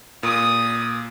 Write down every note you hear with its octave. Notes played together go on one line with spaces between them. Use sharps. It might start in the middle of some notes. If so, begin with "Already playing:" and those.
A#2 D#6